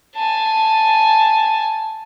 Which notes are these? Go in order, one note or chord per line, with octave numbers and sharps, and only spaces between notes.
G#5 A5